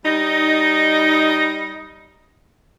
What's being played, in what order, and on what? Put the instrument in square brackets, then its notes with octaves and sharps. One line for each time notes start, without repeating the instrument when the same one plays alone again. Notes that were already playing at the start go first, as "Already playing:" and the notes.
[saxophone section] G3 D#4